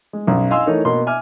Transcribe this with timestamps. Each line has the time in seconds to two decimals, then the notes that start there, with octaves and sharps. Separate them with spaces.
0.13 G#3
0.27 B1 F#2 C#4 C#5
0.51 D#5 F5 G#5 C6 E6
0.66 E3 A3 D#4 A#4 C#5
0.85 B2 A#3 C6
1.07 E5 G#5 D6 F6